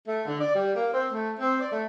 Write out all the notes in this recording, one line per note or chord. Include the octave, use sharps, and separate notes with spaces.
A3
D3
D5
G3
A#3
C4
A3
C4
D5
A3